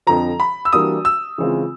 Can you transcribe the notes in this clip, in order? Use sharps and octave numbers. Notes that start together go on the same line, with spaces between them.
F2 D3 F3 A#5
B5
E6
E3 G3 A#3 D4 F#4 D#6
E6
C#3 E3 G#3 C4 F4